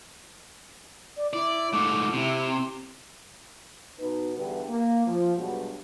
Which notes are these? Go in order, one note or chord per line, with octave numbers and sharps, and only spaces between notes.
D5
E4 D5
G#2 A3 D6
C3 E4
B2 D#4 B4
E2 G2 D3 G4 B4
A#3
F3
G2 B2 F#3 G#3 F#4